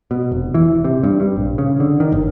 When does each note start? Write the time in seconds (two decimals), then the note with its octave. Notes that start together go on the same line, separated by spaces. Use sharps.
0.11 B2
0.32 F1
0.54 E3
0.70 E1
0.84 C3
1.03 G2
1.20 G2
1.36 A#1
1.58 C#3
1.80 D3
2.00 D#3
2.12 G1